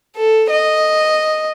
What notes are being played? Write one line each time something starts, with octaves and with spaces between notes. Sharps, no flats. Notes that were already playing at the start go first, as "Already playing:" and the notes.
A4
D#5